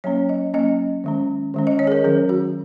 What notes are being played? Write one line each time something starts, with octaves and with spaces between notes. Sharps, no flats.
F#3 A#3 C#4 C#5
D#5
F#3 A#3 C#4 D#5
D#3 G#3 C#4
D#3 G#3 C#4
D#5
C#5
G#4
A#4
D#3 F#3 C#4 A#4
F#4